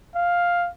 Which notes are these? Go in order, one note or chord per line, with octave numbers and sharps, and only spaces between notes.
F5